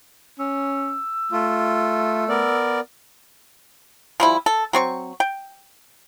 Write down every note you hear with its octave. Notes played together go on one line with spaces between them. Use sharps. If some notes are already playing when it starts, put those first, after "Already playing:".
C#4 E6
A3 F4
B3 A#4 D5
F3 G3 E4
A4
F#3 C4 C#6
G5